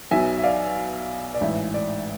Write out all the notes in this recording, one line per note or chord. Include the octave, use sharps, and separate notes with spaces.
B1 B2 E5 G#5
E5
D5 F5
D5
A1 G#2 E3 E5
D5